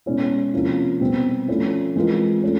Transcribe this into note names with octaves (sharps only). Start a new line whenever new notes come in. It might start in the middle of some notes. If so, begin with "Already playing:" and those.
B2 G#3 C#4 E4
C3 F3 A#3 C#4 E4
B2 G3 C4
F3 A3 C#4 E4
E3 G#3 C4 F4 A#4
A3 C#4 F4 A4